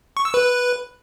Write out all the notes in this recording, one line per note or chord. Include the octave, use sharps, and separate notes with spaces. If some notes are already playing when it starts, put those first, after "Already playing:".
C#6
E6
B4